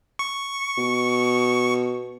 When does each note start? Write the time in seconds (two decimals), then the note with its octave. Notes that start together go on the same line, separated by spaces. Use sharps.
0.19 C#6
0.77 B2